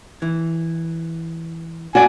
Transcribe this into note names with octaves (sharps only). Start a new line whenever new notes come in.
E3
D4 F#4 D5 G#5